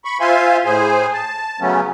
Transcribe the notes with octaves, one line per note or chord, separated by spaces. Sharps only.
B5 C#6
F4 C5 E5 F5 G#5 C6
A2 G#4 C5 G#5
A5
C#3 F#3 A3 B3 C#4